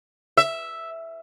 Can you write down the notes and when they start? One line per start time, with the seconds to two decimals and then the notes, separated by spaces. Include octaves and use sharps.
0.37 E5